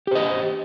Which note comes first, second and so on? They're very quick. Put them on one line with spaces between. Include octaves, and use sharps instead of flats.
G4 C5 D#5